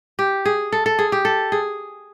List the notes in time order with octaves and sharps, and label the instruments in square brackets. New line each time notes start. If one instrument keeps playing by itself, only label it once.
[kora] G4
G#4
A4
A4
G#4
G4
A4
G#4